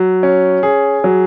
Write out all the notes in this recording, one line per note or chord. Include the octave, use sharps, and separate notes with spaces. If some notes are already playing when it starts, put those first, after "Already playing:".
Already playing: F#3
C#4
G#4
F#3